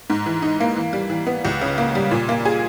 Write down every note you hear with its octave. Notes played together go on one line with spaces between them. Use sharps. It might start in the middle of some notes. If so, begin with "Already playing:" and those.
G#2
E3
D#4
A#3
E3
G3
E3
B3
C#2
C#3
A#3
G3
A#2
A#3
G#4